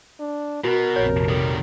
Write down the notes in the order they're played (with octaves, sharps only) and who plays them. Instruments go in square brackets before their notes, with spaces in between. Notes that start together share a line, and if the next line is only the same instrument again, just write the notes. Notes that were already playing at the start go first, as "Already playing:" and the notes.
[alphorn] D4
[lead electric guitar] B2 B3 [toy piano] F#4 [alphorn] A#4
[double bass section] A#1 F2 C3 [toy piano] C#5
[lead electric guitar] D#3 G3 [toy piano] A4